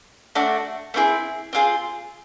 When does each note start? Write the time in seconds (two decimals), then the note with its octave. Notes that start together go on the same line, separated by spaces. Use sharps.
0.35 A3 D4 F#4
0.94 A3 C4 E4 G#4
1.53 C4 F4 G#4